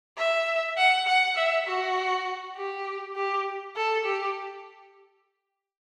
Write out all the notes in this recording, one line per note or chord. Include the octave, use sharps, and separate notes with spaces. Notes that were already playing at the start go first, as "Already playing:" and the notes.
E5
F#5
F#5
E5
F#4
G4
G4
A4
G4